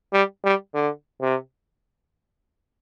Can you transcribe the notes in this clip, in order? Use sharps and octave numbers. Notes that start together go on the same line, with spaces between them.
G3
G3
D3
C3